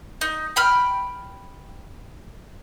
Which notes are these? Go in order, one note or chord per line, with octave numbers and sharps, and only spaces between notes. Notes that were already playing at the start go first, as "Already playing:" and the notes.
D#4
G5 B5 F6